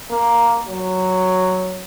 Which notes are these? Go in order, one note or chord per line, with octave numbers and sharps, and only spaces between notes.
A#3
F#3